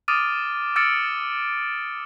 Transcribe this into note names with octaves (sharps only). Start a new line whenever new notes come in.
D6 D#6 F6 A6 D7 D#7
D6 E6 F6 A6 C#7 D7